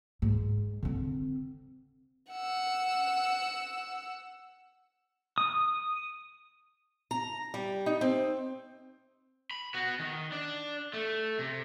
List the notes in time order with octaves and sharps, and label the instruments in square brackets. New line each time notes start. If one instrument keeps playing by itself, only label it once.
[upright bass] G#2
D3 C4
[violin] F#5 E6
[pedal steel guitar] D#6
[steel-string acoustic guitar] A#5
G3
D#4
C4
[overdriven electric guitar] B5
B3 F#4
D#3
D4
A3
C3